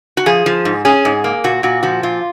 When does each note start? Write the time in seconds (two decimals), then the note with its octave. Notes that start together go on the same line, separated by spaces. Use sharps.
0.17 F#4
0.26 F3 G#4
0.46 F3
0.65 G#2
0.85 C#4 G#4
1.05 G#2
1.24 A#3
1.44 A#2 F#4
1.63 A#2 F#4
1.83 F3 F#4
2.03 A#2 F4